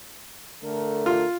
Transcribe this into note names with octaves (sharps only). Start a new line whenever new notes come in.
D3 A3 A#4
F4